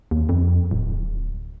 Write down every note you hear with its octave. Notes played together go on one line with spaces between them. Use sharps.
D#2
F2
D1